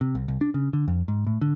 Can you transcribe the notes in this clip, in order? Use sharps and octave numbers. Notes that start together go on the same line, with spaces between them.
C3
C2
C2
D4
C#3
D3
F2
G#2
A2
D3